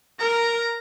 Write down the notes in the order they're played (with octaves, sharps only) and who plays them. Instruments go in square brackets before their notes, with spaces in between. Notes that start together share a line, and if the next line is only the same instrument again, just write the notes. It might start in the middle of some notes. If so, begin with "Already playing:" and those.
[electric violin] A#4 [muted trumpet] A#5